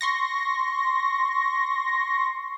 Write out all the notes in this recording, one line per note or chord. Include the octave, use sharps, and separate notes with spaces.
C6 C#6 A#6